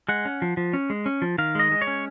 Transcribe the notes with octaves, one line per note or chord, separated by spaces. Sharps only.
G#3 F#5
C#4
F3
F3
C#4
G#3
C#4
F3
D#3 F5
G#3 D#5
G#3
C#5
C#4